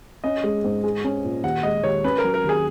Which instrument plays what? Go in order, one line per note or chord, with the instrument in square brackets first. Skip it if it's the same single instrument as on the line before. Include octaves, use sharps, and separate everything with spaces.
[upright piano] C#4 [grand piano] D#5
[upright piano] G#3
G#2
G#4
C#4
A#2
[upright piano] D#2 [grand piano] F#5
[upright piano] G#3 [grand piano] D#5
[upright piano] D#2 [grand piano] C#5
[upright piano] C#4 [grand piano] B4
[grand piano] A#4
[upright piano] F#3
[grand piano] A#4
[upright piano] D#2 [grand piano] G#4